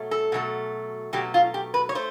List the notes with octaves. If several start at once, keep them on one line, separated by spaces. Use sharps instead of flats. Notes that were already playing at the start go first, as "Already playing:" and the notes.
Already playing: B2 F#3 A3
A4
B2 F#3 A3
B2 F#3 A3 G4
F4
G4
B4
C#5
A3 C5